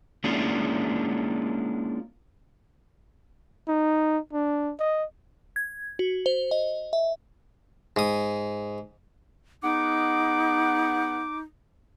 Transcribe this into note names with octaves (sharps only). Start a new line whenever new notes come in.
G#3 A#3 C#4 D4 E4 F4
D#4
D4
D#5
G#6
F#4
C5
D#5
E5
G#2 D#6
B3 D#4 G#4 F#5 D6